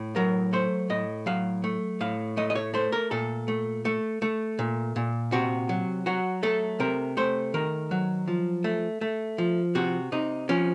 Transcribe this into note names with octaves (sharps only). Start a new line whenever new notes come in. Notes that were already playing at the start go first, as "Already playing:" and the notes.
Already playing: A2
F#3 A#4
A3 C5
A2 D#5
F#3 F5
A3
A2 F5
A3 D#5
D#5
C#5
A3 C5
A#4
A#2 A4
A3
A3
A3
A#2
A#2
C3 F#4
F#3
F#3 F#4
A3 A4
C3 A#4
A3 C5
D#3 A#4
F#3
F3
A3
A3
F3
C3 F#4
C3 D#4
F3 C#4